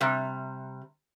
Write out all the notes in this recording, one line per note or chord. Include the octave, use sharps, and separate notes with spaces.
C3 G3